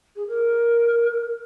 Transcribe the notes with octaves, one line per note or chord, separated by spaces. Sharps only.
G#4
A#4